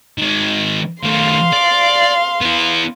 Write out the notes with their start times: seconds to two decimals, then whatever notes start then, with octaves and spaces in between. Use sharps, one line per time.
0.18 D#3 G#3
1.03 D#3 A3 F5 C6
1.53 D5
2.41 B3 E4